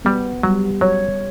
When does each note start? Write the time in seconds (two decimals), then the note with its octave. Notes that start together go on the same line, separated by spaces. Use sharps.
0.05 G3 B3
0.43 F#3 G3
0.81 F#3 C#5